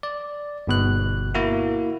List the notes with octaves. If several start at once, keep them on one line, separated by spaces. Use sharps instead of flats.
D5
G1 B2 F#6
A#3 E4 F#4